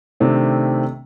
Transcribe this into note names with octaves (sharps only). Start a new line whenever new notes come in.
C3 D#3 A3 C4 D4